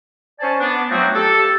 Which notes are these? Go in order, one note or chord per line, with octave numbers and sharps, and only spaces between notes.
C#4 C5 D5 G#5 A5
B3 D4
F3 F#3 A3 C4 D#4 F#4
G4 A4